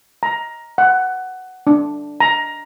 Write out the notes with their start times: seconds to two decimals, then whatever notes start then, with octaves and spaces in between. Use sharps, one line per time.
0.23 A#5
0.78 F#5
1.67 D4
2.20 A#5